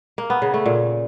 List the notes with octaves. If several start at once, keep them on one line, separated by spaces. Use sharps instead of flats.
A#3
B3
C#3
A3
A#2